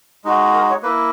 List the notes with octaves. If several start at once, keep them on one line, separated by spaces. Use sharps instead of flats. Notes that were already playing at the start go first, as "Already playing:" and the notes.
G#3 D#4 F#4
A#4
C#5
A#3 E4 B4